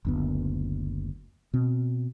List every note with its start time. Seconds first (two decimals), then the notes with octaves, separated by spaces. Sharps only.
0.05 F#1 D2 B3
1.53 B2 C4